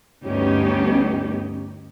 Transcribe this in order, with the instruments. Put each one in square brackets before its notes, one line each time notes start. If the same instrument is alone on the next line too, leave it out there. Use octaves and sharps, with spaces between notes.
[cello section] D2 G2 B3 C#4 D#4 G4